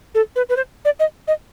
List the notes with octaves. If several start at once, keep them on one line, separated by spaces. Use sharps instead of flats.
A4
B4
B4
C5
D5
D#5
D#5